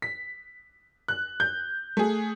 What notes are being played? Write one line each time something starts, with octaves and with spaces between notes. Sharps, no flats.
B6
F#6
G6
A3 G#4